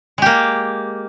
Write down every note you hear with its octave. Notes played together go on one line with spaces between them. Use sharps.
G#3 A#3 G4